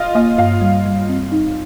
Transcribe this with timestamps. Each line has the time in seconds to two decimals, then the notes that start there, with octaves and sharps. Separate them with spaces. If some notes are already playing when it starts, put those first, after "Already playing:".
Already playing: F4 D#5
0.15 A#3 D#5
0.38 G2 F5
0.61 G3
0.86 G3
1.09 C4
1.32 D#4